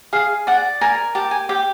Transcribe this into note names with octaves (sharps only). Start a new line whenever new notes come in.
G#4 F5
D5 F#5
A#4 G#5
G4 A5
G#5
G4 G5